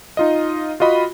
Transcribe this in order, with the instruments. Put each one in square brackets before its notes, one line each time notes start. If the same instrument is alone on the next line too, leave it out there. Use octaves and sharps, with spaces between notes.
[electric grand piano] D#4 F4 D#5
F4 F#4 D#5 B5